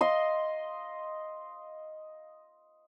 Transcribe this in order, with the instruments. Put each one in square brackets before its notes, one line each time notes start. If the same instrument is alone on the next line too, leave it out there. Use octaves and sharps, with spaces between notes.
[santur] D#5 F5 C6